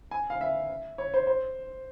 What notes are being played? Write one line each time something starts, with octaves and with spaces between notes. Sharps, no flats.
G#5
F5
E5
C#5
C5
C5